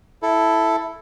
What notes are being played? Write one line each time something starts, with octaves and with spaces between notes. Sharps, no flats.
E4 A4